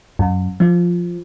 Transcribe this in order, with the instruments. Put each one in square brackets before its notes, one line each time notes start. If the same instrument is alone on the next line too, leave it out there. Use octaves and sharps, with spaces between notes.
[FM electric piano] F#2
F3